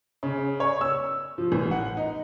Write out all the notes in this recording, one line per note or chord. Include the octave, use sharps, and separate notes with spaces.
C#3
C#5
E6
F3
A1
F#5
D#4